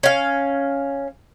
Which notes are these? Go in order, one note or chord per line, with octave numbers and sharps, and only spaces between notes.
C#4 F5